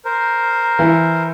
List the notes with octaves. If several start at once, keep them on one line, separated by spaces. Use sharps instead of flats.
A#4 C5
E3